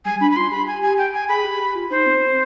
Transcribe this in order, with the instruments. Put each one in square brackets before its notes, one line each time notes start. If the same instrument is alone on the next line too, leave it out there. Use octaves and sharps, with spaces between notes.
[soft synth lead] G3 [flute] G#5
[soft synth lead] D4 [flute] B5
[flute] B5
[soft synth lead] F4 [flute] C6
[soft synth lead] G4 [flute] B5
[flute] G#5
G#5
G5
G#5
[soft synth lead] G#4 [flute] B5
[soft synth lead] G4
G4
F4
[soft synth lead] D#4 [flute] C5
[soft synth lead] C4
C4